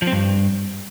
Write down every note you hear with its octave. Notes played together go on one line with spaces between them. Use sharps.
F3
C4
G2